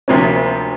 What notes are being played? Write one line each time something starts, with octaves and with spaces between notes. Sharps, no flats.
D2 C3 F3 A#3 C#4